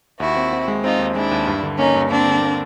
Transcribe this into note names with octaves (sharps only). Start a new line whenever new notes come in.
D#2 E4 F#4
C4
C4
G#3
C4 D#4 F4
D#2
G#3 D4 E4
D#2
G2
D3
A#3 C#4 D#4
G2
A#3 C4 D4
D3
A#3